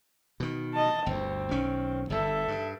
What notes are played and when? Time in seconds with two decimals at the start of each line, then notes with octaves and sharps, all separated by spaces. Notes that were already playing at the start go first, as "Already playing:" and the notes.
0.40 B2 D#3
0.74 D#5 A5
1.06 G1 D2 C4
1.51 B1 D#3 C#4
2.10 G1 G2 A4 E5
2.48 G2